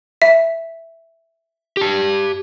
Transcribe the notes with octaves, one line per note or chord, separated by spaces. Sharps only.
E5
G4 A5